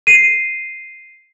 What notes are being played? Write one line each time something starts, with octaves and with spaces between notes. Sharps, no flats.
C7 D#7